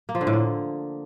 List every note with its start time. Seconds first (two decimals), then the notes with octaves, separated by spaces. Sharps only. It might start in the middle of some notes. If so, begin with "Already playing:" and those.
0.09 A#3
0.15 F3
0.21 D3
0.27 A2
0.33 A#3